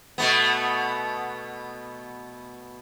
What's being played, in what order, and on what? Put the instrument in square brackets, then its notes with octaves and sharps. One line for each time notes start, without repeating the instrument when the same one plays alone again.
[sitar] B2 A3 B3